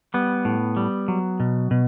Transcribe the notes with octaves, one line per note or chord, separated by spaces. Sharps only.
G3 B3
A2
G3
F#3
B2
B2